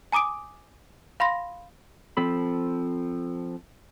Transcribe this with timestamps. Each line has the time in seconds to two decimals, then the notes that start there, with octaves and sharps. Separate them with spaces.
0.12 G#5 A#5 D6 D#6 D7
1.20 F5 B5 C6 A#6
2.17 F3 C4 A4 B5